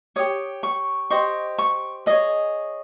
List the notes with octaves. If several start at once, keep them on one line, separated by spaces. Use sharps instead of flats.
G4 C#5 D#6
C#6
G4 C5 D#5 C#6
C#6
G#4 C#5 D#5